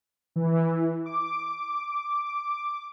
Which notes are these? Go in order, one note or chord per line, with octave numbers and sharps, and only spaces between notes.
E3
D6